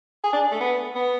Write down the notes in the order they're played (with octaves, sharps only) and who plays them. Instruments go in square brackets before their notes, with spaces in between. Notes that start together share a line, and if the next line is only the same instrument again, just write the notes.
[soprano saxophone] G#4
D4
A3
B3
B3